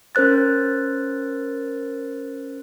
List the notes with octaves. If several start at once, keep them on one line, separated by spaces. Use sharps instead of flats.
C#4 A#4 C5 F#6 A6